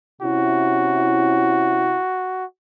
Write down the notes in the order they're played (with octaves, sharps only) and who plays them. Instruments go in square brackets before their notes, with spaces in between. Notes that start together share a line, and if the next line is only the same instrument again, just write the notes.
[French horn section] C3 C#4 E4 [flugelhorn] F#4